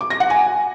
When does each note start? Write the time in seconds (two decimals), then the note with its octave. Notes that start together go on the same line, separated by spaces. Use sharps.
0.01 D6
0.10 A#6
0.20 F#5
0.30 G#5